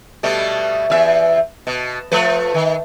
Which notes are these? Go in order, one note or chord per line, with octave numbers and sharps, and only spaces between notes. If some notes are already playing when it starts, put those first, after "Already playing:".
B2 G3 A3
E2 E5
B2
F3 A3 B4
D#3